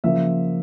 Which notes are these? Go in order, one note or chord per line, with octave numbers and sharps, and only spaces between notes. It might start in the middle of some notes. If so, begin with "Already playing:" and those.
C#3 F3 A#3 E5